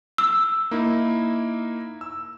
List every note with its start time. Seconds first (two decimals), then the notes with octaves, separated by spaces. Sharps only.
0.18 E6
0.71 A#3 D#4 E4
2.01 E6